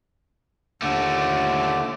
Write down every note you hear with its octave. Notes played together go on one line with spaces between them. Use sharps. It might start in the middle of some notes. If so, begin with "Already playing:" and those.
D#2 A#2 D3 A3 D6